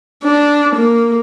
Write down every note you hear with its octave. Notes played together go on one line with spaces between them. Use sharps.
D4
A#3